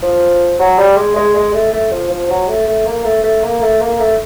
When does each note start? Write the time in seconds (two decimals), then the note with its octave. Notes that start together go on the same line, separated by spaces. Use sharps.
0.02 F3
0.59 F#3
0.78 G3
0.96 G#3
1.15 G#3
1.35 G#3
1.53 A3
1.73 A3
1.92 F3
2.10 F3
2.29 F#3
2.48 A3
2.67 A3
2.85 A#3
3.05 A3
3.23 A3
3.42 A#3
3.61 A3
3.80 A#3
3.99 A3